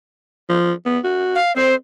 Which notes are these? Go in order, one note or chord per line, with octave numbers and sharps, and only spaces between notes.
F3
B3
F#4
F5
C4 C5